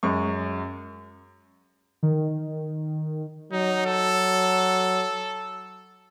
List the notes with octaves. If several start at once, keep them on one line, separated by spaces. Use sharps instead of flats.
F#2 G#3 C#6
D#3
F#3 D#4
A4